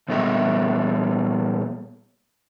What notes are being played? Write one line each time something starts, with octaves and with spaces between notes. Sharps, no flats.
A#2 G3 B3 G4 D#5 E5